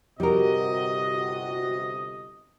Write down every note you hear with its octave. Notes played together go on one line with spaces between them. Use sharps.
G1 C3 G3 F#4 A#4 D#5